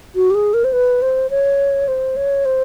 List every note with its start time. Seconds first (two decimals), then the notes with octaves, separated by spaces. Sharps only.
0.15 F#4
0.31 G4
0.35 G#4
0.54 A#4
0.64 C5
0.73 B4
1.02 C5
1.30 C#5
1.88 C5
2.16 C#5
2.45 C5